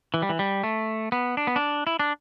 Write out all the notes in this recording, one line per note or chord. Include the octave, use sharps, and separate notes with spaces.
E3
G3
E3
G3
A3
B3
D4
B3
D4
E4
D4